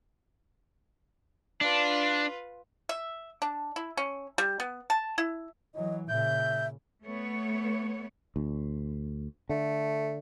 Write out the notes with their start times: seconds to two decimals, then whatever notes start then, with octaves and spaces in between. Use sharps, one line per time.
1.61 D4 F4 B4
2.89 E5
3.42 D4
3.76 E4
3.97 C#4
4.38 G3
4.60 B3
4.90 A5
5.18 E4
5.75 E3 F#3 D#5
6.09 A#2 C#3 E5 G6
7.04 A3 B3 C#5
8.36 D2
9.49 D3 A3